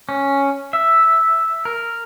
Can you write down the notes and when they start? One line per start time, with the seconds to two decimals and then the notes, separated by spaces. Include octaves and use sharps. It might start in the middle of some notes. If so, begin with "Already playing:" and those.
0.09 C#4
0.73 E5
1.65 A#4